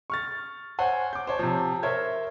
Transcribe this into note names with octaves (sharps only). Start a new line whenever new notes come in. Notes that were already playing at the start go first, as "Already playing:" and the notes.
C#6 F6 A6
C5 C#5 F#5 G#5
D6 G6
C5 C#5 A5
C3 F3
A#4 C5 C#5 E5 G#6